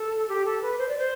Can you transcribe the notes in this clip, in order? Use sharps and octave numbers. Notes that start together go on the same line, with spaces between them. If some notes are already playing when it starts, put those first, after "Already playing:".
Already playing: A4
G4
A4
B4
C5
D5
C5